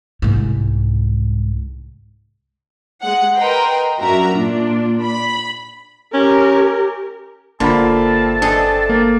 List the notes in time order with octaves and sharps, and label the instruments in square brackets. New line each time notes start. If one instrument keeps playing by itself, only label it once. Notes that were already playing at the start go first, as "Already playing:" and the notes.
[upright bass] C2 G#2
[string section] G#3 F#5
A#4 B4 D#5 G5 A#5 C6
F#2 D4 F#4 A#4 E5 A#5
A#2 D4 F4
B5
[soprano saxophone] C#4 [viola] G4 A#4
[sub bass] G1 [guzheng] D3 [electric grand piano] A#3 F4 B5 [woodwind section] C4 E5 A5
[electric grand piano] D4 [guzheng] G#4 A4 D#5
[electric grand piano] A#3